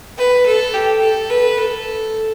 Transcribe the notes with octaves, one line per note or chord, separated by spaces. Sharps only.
B4
A4
G4
A4
B4
A4